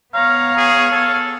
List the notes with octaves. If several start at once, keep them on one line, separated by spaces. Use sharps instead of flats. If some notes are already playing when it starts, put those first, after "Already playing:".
B3 C#5 F5 A#5
G#4
A4